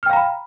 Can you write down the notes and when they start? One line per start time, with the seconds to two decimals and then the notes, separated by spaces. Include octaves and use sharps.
0.03 F6
0.06 G5
0.10 F5
0.13 A#5
0.16 B5